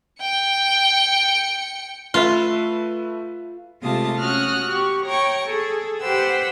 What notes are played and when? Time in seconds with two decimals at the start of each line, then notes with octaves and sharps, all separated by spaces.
0.21 G5 C#7
2.14 A3 F4 B4 E5
3.81 C3 G#3 A3 F4 A5 D#6
4.19 C#4 F#4 D#6 F6 F#6
4.66 F#4 G4 C#6
5.06 C#5 G5 A#5 C#6
5.47 G#4 A4
6.00 G4 B4 C5 F#5 G5 E6